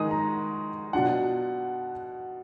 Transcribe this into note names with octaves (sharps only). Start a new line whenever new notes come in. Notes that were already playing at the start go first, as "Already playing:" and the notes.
Already playing: D#3 G#3 D#4 D#6
A#5
B2 F#3 D4 F4 F#5